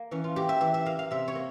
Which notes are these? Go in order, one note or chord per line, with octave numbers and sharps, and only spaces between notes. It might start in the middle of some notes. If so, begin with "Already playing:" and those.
Already playing: A#3
E3 C#4
F4
A#3 G4
E5
E3 E5
E5
A#3 F5
F5
C3 E5
C#5
A#3